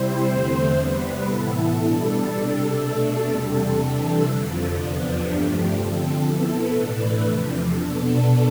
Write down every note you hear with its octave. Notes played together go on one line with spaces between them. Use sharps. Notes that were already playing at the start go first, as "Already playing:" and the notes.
Already playing: C3 G3 C4 E4 C5
E2 D3 A3 C4 C5
C3 G3 B3 B4
A2 E3 B3 E4 A4
B2 G3 D4 A4
C3 G3 D4 A4
B2 A3 D4 A4
E2 C3 G3 A4
C3 E3 G3 D4 A4
F2 D3 F3
E2 C3 F3 B3 D4
G2 F3 A3 D4 G4
D3 F3 C4 A4
B2 B3 E4 A4
A2 E3 A3 D4 B4
E2 C3 F3
B2 B3 D4 A4